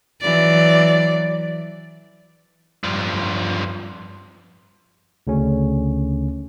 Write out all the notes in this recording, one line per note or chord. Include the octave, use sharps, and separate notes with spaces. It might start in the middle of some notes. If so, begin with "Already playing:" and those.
E3 F#3 D5
G2 F3
D2 C#3 C#4